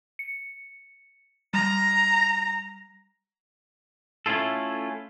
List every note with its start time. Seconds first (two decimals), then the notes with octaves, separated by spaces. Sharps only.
0.19 C#7
1.54 G3 A#5
4.26 A3 C#4 E4 F4 A4